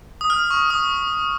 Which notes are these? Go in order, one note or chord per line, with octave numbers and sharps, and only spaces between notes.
D#6
F6
C#6
D#6